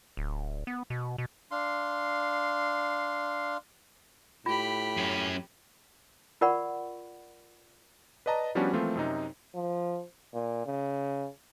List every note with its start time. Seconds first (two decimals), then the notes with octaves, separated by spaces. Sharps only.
0.17 D1
0.67 B3
0.90 B2
1.18 B2
1.51 D4 F5 C6
4.46 A2 F4 G4 B5
4.97 F#2 C#4
6.41 F4 A#4 D5 F#5 B5 C#6
8.26 B4 D5 D#5 A5 A#5
8.55 F3 G3 B3 C#4 D4 F#4
8.73 E3 F3 A3 A#3 C4 F4
8.95 F#2 C3 D#4
9.55 F3
10.34 A#2
10.66 C#3